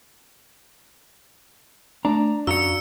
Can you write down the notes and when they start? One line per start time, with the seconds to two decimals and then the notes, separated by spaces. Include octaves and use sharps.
2.05 A3 D4 A#5
2.47 F#2 F#4 F5 A#5 E6 C#7